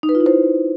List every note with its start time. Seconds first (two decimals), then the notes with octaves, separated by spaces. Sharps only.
0.03 D#4
0.09 B4
0.15 F4
0.21 E4
0.26 C5